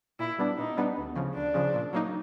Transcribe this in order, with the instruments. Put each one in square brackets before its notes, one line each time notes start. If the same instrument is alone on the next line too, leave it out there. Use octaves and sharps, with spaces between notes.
[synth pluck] A#2 [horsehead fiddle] E4
[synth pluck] G3 B3 D4
[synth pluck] A#2 [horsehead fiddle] D#4
[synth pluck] G3 B3 D4
D2
C#3 F3
[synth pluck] D2 [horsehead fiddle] D4
[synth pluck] C#3 F3
A#2
F#3 A#3 D#4